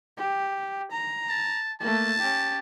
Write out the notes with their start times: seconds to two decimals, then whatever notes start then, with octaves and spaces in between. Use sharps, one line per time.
0.17 G4
0.92 A#5
1.29 A5
1.80 A3 A#3 A5
2.19 C#4 G4